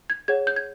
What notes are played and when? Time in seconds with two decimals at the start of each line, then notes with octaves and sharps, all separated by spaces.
0.10 G#6
0.28 G#4 C#5 F#5 G#6
0.47 G6
0.56 G#6